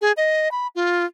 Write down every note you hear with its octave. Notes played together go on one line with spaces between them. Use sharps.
G#4
D#5
B5
F4